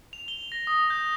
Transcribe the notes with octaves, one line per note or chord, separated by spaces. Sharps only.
F7
G7
A#6
D#6
G6